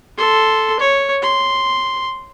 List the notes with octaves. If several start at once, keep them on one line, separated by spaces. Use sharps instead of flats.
A4 C6
C#5
C6